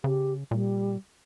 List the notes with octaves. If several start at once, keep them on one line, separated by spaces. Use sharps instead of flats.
C#3 G4
A#2 G3